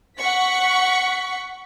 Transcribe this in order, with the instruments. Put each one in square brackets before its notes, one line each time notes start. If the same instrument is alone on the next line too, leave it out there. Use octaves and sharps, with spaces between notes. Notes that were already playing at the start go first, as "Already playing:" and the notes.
[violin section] F#5 C#6 B6